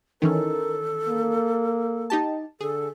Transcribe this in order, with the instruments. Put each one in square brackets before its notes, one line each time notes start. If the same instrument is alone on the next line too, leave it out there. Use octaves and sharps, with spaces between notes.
[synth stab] D#3 E3 C#4 [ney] A4 [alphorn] A#4
[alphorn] A#3
[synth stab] D#4 G4 A5
[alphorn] D3 [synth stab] G#4 [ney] A4